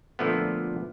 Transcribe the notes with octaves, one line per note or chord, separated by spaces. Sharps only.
A#2 D3 F3 A3 B3